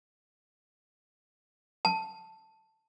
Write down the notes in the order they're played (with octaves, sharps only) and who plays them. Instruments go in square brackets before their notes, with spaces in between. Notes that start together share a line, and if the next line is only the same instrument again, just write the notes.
[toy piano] A5